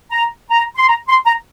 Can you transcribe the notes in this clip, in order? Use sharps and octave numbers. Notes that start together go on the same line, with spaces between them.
A#5
A#5
C6
A#5
C6
A#5